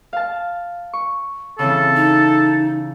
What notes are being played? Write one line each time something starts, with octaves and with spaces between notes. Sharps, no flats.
F5 A5
C#6
C#3 E3 C4 A4
D#4